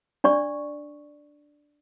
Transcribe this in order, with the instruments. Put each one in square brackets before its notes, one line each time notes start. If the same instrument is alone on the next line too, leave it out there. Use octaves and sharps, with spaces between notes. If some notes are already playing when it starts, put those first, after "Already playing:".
[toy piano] D4 D5 C#6